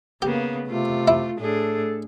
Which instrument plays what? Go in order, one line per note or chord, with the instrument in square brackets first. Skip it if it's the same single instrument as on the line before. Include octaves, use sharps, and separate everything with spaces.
[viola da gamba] C#3 A#3 B3 [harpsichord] G4
[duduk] C3 [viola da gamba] A3 F4
[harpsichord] E4
[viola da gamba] A2 D4 G#4 [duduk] A4